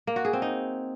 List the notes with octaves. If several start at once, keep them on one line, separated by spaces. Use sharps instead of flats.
A#3
F#4
G#4
C4
D#4